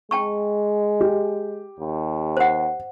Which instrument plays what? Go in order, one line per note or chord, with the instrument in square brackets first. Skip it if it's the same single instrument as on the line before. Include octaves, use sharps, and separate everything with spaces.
[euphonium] G#3 [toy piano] G5 A5 C#6
[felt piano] G4
[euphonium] D#2
[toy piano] C5 F#5